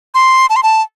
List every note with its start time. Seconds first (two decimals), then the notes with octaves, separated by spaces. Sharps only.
0.14 C6
0.50 A5
0.56 C6
0.63 A5